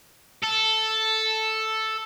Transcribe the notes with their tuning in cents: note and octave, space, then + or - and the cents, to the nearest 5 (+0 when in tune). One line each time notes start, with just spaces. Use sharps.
A4 +0